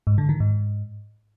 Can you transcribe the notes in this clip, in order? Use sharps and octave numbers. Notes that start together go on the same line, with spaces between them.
G#2
D3
D#3
G#2